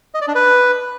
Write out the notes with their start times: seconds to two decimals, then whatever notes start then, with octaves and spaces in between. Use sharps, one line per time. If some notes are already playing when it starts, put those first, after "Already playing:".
0.14 D#5
0.21 D5
0.28 D4
0.35 B4